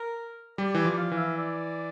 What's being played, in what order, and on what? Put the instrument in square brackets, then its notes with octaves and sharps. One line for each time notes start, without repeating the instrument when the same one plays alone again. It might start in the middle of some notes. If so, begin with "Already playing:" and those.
Already playing: [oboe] A#4
[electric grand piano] G3 [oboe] D5
[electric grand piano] E3 [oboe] D5
[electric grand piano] F3
[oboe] F5
[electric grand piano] E3
[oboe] E5
D5